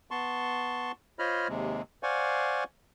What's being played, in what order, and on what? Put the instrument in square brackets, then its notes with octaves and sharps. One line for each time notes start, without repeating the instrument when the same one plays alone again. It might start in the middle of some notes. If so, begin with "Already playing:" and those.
[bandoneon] B3 A5 C6 C#6
F4 C5 C#5 D#5 B5 F6
D#2 C3 G#3
C5 D5 F5 F#5 G#5 C#6